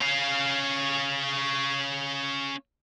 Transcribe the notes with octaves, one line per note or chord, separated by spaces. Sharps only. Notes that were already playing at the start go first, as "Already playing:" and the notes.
C#4 F5